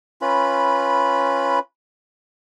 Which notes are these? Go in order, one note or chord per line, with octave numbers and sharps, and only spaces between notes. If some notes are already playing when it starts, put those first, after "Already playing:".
C#4 F4 B4 B5